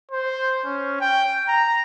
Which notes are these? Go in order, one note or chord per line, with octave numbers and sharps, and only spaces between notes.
C5
C#4
G5
A#5